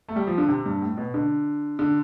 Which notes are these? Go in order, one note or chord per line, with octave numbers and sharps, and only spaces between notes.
A3
G3
F3
D3
C3
G2
A2
B2
D3
D3